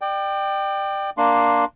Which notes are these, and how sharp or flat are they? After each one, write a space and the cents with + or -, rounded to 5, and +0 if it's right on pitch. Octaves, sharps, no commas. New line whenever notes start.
D5 +35 G5 +0
A#3 +0 D4 +0 C6 +0